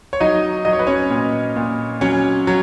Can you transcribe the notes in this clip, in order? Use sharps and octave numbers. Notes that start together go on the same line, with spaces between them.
C#5
F#3 D#4 D#5
F#3 D#5
C#5
B4
C#4 C#5
A#2
A#2
F#3 C#4 C#5
F#3